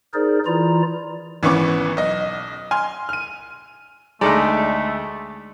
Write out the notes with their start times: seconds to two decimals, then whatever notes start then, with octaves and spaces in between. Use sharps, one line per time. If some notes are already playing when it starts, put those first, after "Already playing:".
0.14 D#4 G#4 A#4 C5 D5
0.46 E3 E4 F4 D5 A#5
1.43 G#1 E3 B3 C#4 C#6 D6
1.97 B1 D#5
2.71 G#5 C6 F6
3.09 F6 D#7
4.21 D2 G#3 A3 D#4 A4 D5